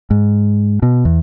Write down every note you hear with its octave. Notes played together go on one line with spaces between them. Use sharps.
G#2
B2
E2